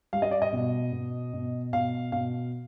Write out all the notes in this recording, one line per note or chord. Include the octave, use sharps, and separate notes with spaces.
G3 F5
D#5
D5
D#5
B2
B2
B2
B2 F5
B2 F5